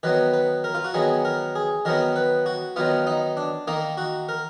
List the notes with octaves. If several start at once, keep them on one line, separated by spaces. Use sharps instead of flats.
D#3 F#3 B3 B4
B4
A#4
F4
F#4
D#3 F#3 B3 G#4
A#4
G#4
D#3 F#3 B3 A#4
B4
F#4
D#3 F#3 B3 F4
D#4
D4
D#3 A#3 D#4
F#4
A#4